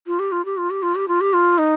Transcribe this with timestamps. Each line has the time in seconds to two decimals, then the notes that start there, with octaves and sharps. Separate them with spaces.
0.07 F4
0.19 G4
0.32 F4
0.45 G4
0.57 F4
0.70 G4
0.83 F4
0.95 G4
1.08 F4
1.21 G4
1.33 F4
1.58 D#4